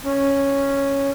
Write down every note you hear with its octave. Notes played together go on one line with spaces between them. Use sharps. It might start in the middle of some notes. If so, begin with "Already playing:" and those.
C#4